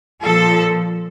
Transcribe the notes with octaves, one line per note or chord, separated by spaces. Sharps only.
A#2 F3 A4